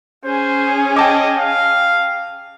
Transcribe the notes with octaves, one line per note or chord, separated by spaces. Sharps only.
C#4 G#4 C5
D#5 G5 A5 D6
F5